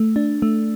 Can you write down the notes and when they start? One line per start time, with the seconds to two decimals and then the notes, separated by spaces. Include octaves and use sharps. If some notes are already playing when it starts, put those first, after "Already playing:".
Already playing: A3
0.16 D4
0.42 A3